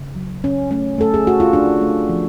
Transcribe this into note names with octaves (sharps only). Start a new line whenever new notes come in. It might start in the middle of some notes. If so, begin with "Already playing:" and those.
Already playing: C#3
F#3
C#3 C#4
A3 C#4
A3 A4
G#4
A3 F#4
F4
A3 D4
A3
F3